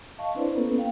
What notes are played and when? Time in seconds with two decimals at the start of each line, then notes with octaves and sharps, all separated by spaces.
0.18 D#5 F5 A5 C#6
0.35 C4 D4 E4 B4 C5 D5
0.56 A#3 B3 C#4 A4 B4
0.77 A#3 F5 G5